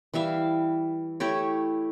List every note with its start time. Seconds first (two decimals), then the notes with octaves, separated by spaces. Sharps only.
0.14 E3 G3 E5 F5
1.20 A3 E4 G4 C#5